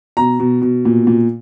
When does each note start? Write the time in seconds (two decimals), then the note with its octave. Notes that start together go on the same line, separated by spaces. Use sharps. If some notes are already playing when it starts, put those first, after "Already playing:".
0.17 B2 A#5
0.40 B2
0.62 B2
0.85 A#2
1.07 A#2